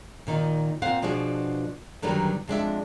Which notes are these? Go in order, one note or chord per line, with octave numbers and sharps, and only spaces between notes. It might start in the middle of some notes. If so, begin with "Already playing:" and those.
A#2 D#3 D#4
A#2 C4 F5 F#5
B2 F3 B3 D4 F#4 G#4
F#2 D3 D#3 F#3 G3 B3
F2 G#3 D4 E5